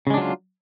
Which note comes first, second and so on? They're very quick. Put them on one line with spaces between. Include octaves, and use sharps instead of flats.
C#3 G#3 D4 F#3 F4